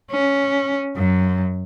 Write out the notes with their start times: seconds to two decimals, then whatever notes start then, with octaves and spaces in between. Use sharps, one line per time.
0.11 C#4
0.96 F#2